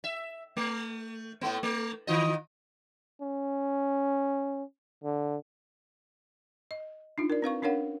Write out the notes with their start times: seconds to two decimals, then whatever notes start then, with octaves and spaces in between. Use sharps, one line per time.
0.04 E5
0.57 A3
1.41 A2 A3 B3
1.63 A3
2.07 D#3 F4 D#5
3.21 C#4
5.04 D3
6.71 D#5
7.18 D4 D#4 F4
7.30 A#4 D5
7.42 C4 B4 F5 C#6
7.62 C#4 D4 A#4 C#5 F5 F#5